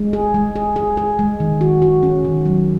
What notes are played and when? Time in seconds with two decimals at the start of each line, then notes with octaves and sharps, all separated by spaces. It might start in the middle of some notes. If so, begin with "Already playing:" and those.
Already playing: G#3
0.13 G#4
0.34 G#3
0.56 G#4
0.76 G#4
0.97 G#4
1.19 G#3
1.40 D#3
1.61 F#4
1.82 F#4
2.03 C#4
2.25 D#3
2.46 F#3